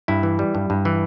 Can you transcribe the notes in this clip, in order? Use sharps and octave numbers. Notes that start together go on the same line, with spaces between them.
G2 E4
E3
G3
G2
G2
E3